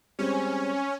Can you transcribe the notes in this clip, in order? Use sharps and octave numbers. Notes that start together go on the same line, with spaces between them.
G3 G#3 C4 C#4